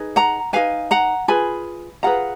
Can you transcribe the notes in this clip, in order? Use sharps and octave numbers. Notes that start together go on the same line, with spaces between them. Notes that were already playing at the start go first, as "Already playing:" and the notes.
Already playing: D#4 G#4 B4
F#5 A#5
D#4 G#4 B4 F5 G#5
F#5 A#5
F4 G#4 B4 G#5 B5
F4 G#4 B4 F#5 A#5